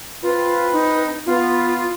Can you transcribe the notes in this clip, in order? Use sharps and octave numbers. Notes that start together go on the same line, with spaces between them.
C4 F4 B4
D#4
B3 F4